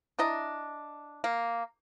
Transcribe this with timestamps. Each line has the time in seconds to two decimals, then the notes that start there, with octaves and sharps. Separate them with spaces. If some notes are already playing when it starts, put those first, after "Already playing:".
0.19 D4 E4 D#5 A#5
1.24 A#3